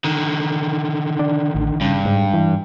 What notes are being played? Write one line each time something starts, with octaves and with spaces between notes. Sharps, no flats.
D3 D#3
D4
A1
G2 C#3
G#2
E3